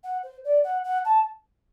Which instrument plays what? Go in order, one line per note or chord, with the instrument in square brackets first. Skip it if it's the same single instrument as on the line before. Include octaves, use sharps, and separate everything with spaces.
[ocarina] F#5
C5
D5
F#5
F#5
A5